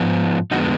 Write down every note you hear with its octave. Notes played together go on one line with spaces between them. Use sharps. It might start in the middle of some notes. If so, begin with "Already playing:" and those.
Already playing: G#2 F3 B3
F2 D3 G#3 B3 D#4 F#4